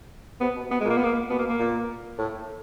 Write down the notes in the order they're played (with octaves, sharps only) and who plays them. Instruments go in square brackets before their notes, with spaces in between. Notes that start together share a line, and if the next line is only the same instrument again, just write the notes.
[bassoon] C3 [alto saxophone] B3
[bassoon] B2
[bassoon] B2 [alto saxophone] B3
[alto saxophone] G#3
[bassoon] A#2
[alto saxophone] A#3
B3
A#3
[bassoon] B2 [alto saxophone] B3
[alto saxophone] A#3
A#3
[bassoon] A#2
A2